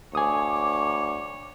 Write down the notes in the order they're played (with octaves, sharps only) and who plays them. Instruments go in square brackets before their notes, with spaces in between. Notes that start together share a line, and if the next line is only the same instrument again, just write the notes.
[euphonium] D2 [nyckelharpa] C#5 [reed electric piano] G#5 D#6 [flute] D6